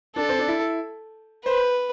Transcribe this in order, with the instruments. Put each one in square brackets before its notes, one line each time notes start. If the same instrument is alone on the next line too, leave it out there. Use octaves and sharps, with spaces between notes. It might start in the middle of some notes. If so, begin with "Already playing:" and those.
[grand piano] D4 [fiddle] A4
[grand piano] C4
D4
E4
[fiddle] B4 [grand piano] C5